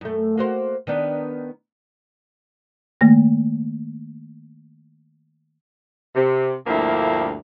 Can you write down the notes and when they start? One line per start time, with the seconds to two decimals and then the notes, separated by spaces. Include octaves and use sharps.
0.01 F#2 A3
0.38 A#3 F#4 C5
0.87 D#3 B3 D4
3.01 D#3 A3 A#3 A#6
6.16 C3
6.67 D2 G2 F3 A3 A#3 E4